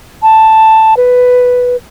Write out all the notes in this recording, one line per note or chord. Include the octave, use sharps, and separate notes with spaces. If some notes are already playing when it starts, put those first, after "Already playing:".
A5
B4